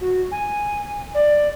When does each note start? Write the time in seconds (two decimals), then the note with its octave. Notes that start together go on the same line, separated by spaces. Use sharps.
0.01 F#4
0.32 G#5
1.15 D5